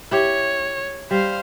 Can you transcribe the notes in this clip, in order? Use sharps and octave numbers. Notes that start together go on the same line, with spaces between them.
E4 G4 C#5
G3 C5 F5